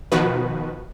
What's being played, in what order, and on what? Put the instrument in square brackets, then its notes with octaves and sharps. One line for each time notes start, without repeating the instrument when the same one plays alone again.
[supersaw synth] B2 D#3 F3 F#4 B4